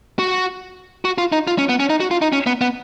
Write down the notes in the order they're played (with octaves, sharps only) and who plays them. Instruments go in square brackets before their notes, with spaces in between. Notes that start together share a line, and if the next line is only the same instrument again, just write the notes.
[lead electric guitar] F#4
F#4
F4
D#4
F4
C#4
B3
C#4
D#4
F#4
F4
D#4
C#4
B3
B3